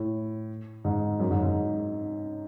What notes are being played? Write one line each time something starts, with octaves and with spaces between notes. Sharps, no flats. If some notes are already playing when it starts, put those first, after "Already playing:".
Already playing: A2
G#2
F#2
G#2
G#2